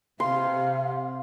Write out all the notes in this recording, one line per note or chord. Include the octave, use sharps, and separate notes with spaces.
C3 F5 C6